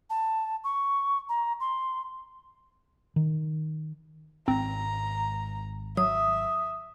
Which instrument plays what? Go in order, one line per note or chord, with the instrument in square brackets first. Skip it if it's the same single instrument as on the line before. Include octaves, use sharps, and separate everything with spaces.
[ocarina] A5
C#6
A#5
C6
[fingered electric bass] D#3
[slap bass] G#1 G#2 [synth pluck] C4 [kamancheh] A#5
[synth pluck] F#3 [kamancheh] E5 [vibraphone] D#6